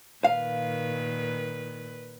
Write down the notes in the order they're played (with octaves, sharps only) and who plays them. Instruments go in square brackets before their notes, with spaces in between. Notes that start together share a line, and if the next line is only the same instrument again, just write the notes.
[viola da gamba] A#2 D#3 B4 [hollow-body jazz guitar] F5